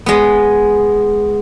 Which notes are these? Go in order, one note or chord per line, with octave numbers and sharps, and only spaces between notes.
G#3 B3